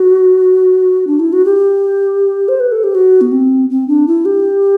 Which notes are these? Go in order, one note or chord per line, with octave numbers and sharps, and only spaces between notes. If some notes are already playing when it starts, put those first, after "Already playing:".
Already playing: F#4
D4
E4
F#4
G4
C5
B4
A4
G4
F#4
B3
C4
C4
D4
E4
G4